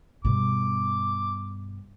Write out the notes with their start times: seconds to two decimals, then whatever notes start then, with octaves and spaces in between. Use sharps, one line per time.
0.25 G2 B2 D6